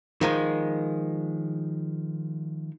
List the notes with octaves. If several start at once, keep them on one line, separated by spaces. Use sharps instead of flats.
D#3 F3 G#3